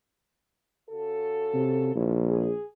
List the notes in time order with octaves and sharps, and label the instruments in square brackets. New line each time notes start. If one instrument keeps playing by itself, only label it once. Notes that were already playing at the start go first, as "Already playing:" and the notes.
[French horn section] C#3 F#4 A4
[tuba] C3
[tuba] A#1 [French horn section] G#2 E4
[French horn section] G#4